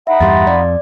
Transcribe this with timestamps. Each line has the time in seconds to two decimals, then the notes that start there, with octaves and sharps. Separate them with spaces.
0.07 D#4 E5 F#5 B5
0.20 E2 G2 G3 F5 C6 A6
0.47 F2 D5